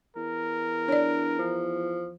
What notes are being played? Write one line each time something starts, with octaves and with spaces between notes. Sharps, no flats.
E2 A#4
D4 C#5 D5
F3